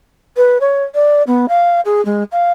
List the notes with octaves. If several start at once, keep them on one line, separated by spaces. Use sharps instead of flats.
B4
C#5
D5
B3
F5
G#4
G#3
F5